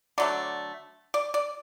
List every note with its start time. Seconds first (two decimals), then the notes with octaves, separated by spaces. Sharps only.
0.18 D3 F#3 A3 D5
1.14 D5
1.34 D5